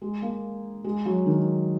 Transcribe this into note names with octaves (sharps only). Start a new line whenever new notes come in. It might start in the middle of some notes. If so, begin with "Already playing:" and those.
G#3
A#3
G#3
F#3
D#3